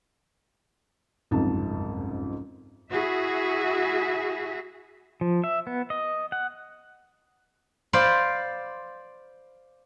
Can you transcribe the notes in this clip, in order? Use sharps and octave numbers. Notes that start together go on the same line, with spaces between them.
F#1 C2 F2 G#2 A5
E4 F#4 G#4 E5
F3
E5
B3
D#5
F#5
C5 D5 F5 B5